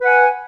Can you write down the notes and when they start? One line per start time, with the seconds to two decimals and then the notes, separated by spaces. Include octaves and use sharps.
0.01 B4
0.04 F#5
0.08 G#5